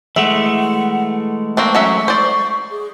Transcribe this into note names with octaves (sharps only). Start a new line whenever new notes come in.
E3 G#3 A3 E5 F#5
A#3 C4 D4 C#6
F#3 C#4 E5
C5 D5
G#4